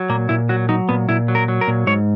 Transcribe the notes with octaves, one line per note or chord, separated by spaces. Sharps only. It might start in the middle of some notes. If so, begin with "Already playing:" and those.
Already playing: F#3
A#2 A#3
A#2 E4
F#3 F#4
F#3 D#4
A#2 B3
A#2 E4
F#3
A#4
F#3
A#4
A#2
G#2 C#5